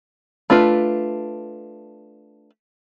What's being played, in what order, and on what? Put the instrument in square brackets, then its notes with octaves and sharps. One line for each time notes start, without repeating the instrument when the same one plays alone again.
[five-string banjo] A3 D4 F4 B4